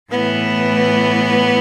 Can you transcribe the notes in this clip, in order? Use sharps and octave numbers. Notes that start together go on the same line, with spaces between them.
A2 E3 B3